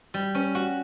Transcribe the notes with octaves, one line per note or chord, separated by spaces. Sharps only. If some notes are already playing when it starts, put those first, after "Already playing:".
G3
C#4
F#4